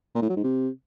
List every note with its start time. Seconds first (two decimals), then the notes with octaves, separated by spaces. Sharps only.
0.15 A#2
0.22 A2
0.29 F#3
0.36 G#2
0.43 C3